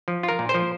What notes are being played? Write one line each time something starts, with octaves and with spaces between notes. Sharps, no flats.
F3
F4
A#4
A#2
C5
F3